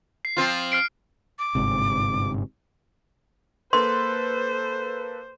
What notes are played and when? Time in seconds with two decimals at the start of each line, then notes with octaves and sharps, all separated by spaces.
0.25 C7
0.37 F3 C4 F4
0.72 F6 C7 D7
1.39 D6
1.55 G1 G#2 C3
3.73 A#3 A4 B4 C5 C6